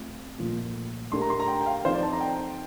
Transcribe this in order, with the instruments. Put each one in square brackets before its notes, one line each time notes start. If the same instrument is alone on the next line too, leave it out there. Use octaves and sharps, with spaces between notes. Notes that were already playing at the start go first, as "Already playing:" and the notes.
Already playing: [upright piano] A3 C4 F4
A#2 F3 A3
[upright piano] A3 D4 G4 A#4 [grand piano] C6
[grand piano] A#5
C6
A#5
G5
G5
F5
[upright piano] F3 C4 D#4 A4 [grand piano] C5
[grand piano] D5
A5
A#5
G5